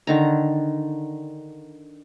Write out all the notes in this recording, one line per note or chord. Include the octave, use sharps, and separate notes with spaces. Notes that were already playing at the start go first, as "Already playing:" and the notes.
D3 D#3 A#5